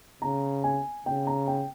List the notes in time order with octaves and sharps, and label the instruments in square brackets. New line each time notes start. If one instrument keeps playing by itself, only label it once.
[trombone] C#3 [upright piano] A#5
[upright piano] G#5
[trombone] C#3 [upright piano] G5
[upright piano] A#5
G5